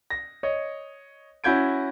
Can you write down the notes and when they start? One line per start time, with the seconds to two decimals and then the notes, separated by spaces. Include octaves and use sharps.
0.10 A#6
0.43 C#5 D#5
1.44 C#4 E4 F#4 G6 G#6 D7